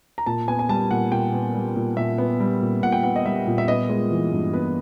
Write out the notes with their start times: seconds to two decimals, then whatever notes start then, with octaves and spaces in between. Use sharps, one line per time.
0.18 A#5
0.26 A#2 A5
0.48 B3 G#5
0.59 G#5
0.69 G3 A5
0.91 A#2 F#5
1.12 A#2 G5
1.33 B3
1.55 G3
1.76 A#2
1.97 A#2 E5
2.18 B3
2.40 G3
2.61 A#2
2.82 A#2 F#5
2.92 G5
3.03 B3 F#5
3.16 D#5
3.25 G3 E5
3.47 A#2
3.58 E5
3.68 B3 D#5
3.89 G#3
4.11 E3
4.32 G2
4.53 B3 B4